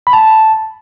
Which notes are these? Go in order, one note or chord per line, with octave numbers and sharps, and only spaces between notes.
B5
A5